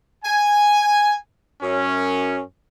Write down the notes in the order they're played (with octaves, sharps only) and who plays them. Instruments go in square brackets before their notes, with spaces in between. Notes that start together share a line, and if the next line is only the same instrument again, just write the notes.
[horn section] G#5
F#2 C#4